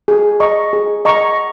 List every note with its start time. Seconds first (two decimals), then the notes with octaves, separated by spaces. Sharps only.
0.08 G#4
0.40 D#5 A#5 C#6
0.73 G#4
1.05 D#5 A#5 C#6